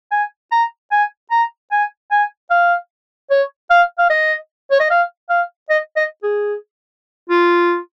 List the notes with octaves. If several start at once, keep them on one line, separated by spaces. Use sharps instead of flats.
G#5
A#5
G#5
A#5
G#5
G#5
F5
C#5
F5
F5
D#5
C#5
D#5
F5
F5
D#5
D#5
G#4
F4